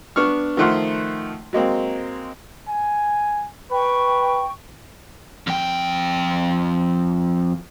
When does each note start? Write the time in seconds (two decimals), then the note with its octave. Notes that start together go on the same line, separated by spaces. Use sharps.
0.16 B3 D4 C#6 F6
0.57 D#3 F3 A3 F#5 C6 F6
1.53 F#3 G#3 A#3 C4
2.68 G#5
3.71 B4 G5 C#6
5.47 F2 G5